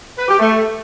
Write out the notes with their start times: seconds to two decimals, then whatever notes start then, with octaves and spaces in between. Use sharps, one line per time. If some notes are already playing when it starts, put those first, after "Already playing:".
0.18 B4
0.29 G4
0.39 A3